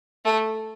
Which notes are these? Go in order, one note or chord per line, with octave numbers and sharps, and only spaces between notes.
A3